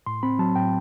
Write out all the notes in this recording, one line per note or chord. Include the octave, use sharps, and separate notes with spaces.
A2 C6
C4 B5
F#3 A5
A2 G5